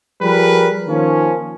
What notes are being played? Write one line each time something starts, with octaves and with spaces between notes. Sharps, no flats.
F3 G3 G#4 A#4 B4
D#3 F3 A#3 C#4